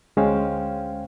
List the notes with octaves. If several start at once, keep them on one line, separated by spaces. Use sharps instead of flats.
D2 G#3 C#4 C5 F5 G5